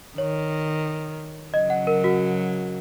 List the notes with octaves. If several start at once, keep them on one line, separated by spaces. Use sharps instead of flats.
D#3 C#5
C#3 F#3 D#5
F#5
A#4
F#4